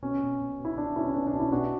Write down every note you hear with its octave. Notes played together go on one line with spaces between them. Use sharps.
B2 C#4
B2
B2
B2
E4
B2 D4
B2 C#4 E4
C#4
B2 D4
D4
B2
C#4 E4
B2 D4 F#4